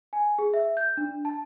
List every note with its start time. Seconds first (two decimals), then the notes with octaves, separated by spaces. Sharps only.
0.13 G#5
0.39 G#4
0.54 E5
0.77 G6
0.97 D4
1.25 A5